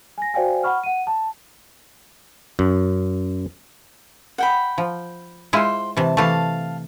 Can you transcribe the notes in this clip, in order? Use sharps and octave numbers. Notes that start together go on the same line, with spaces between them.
G#5 A#6
F#4 C5 D5 F5 G5 G#5
F#5 B5 C#6 F6
F#5 D#7
A5
F#2
F#5 G5 B5
F3
G#3 E4 F4 C5 G5
C3 E3 A5
E3 A3 F5 A5